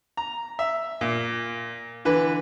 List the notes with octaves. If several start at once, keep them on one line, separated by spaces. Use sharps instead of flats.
A#5
E5
A#2
D3 E3 B4